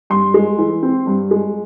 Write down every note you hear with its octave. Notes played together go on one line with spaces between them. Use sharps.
G2 C6
G#3
E3
C4
G2
G#3